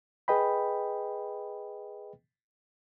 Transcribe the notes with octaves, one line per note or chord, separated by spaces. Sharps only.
G#4 B4 D#5 G5 B5